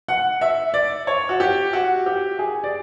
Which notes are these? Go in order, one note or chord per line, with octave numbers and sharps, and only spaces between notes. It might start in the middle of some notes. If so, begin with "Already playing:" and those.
F#5
E5
D5
C#5
F#4
G4
F#4
G4
G#4
D5